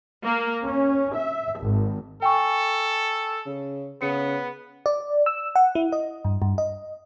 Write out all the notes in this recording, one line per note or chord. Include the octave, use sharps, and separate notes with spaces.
A#3
C#4
E5
G#1
A4 G5 G#5 C#6
C#3
C#3 B3 C#7
D5
E6
F#5
E4
D#5
G2
G2
D#5